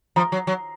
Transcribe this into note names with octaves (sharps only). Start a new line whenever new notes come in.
F3 A#5
F#3
F#3